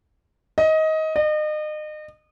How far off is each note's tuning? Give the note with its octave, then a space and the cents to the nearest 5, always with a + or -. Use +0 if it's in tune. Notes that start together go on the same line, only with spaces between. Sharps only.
D#5 +20
D#5 -35